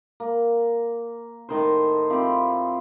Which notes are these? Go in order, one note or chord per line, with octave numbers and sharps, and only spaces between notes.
A#3
A2 D#3 C5
F3 C4 E4 G4